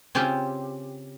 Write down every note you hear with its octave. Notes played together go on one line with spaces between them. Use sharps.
C#3 C4 C#4 F4 G4